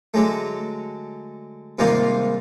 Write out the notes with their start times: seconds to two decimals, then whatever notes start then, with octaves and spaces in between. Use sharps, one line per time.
0.14 D3 F#3 G#3 A3
1.79 G#2 C3 D#3 G3 A#3 F4